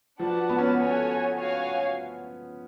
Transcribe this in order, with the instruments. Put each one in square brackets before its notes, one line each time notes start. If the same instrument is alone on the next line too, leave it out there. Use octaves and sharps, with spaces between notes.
[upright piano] F3 [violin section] D4 F#4 B4 F#5 A5
[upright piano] B3
C#4
B3
[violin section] F#4 A4 C#5 G#5
F#4 C#5 F5 G#5